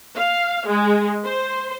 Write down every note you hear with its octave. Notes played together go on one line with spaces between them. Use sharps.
F5
G#3
C5